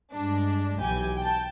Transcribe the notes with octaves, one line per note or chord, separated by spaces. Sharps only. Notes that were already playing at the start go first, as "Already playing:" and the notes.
G2 G#3 D4
B1 E3 G4 G#5
G5 A5